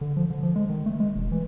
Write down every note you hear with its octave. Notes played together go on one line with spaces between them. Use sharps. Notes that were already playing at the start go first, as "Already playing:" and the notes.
D3
F3
D3
F3
G#3
D#3
A3
G#3
E1
E3